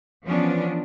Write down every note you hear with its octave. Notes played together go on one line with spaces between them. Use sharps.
E3 F3 B3 C#4 D4